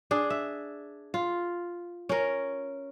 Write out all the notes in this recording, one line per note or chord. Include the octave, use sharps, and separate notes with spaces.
D4 G#4
E5
F4
C#4 A#4